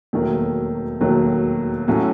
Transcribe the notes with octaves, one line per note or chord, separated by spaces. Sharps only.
E1 D#2 D#3 F#3 A3
E1 D#2 D#3 F#3 A3
A2 F#3 C#4 F#4 A4